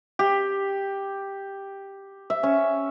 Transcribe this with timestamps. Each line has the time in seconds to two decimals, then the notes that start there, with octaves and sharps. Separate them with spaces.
0.19 G4
2.30 E5
2.43 C#4